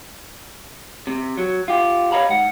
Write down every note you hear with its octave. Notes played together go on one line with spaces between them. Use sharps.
C3
F#3
F4 G4
G4 C#5 D#5 F5 A#5 B5
G#2 F#5